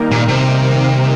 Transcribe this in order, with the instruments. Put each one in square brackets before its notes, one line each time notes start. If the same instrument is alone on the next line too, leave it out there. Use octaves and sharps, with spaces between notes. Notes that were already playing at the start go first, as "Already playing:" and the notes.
Already playing: [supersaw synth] D#3 G3 A#3 D#4 A#4
[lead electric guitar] A#2
C3